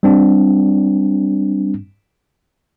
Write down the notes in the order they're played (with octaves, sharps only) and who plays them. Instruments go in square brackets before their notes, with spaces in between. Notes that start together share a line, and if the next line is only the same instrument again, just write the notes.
[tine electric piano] G3 C4 D4